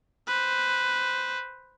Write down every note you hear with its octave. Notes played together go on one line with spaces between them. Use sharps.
B4 C5